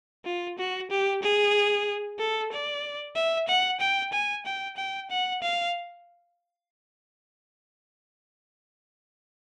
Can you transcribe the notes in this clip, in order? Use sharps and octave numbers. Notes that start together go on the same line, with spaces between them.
F4
F#4
G4
G#4
A4
D5
E5
F#5
G5
G#5
G5
G5
F#5
F5